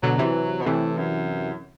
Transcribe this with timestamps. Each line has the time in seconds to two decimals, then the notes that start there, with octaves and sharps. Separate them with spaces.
0.03 B2 D3 F#3
0.18 C3 E3
0.61 B2
0.66 A2 C3 E3
0.98 F#2